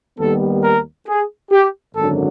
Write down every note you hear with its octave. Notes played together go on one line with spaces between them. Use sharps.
D#2 D#3 G3 B3 A4
A#4
G#4
G4
G#1 F#2 D3 F#3 A4